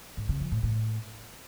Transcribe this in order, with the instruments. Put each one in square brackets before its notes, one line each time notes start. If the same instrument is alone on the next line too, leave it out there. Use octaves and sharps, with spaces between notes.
[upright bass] G#2
C#3
F2
A2
A2